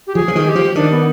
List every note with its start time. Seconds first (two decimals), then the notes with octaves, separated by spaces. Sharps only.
0.07 G4
0.15 F3 G#4
0.28 F3
0.35 D#3
0.45 G#4
0.49 G4
0.55 F3
0.75 D#3 D4
0.91 B3